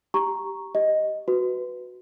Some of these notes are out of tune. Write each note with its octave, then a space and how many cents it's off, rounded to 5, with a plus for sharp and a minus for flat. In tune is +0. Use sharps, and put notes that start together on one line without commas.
G4 +0 A#5 +0 C#6 +0
G4 +0 D#5 +5
F#4 +0 B4 +5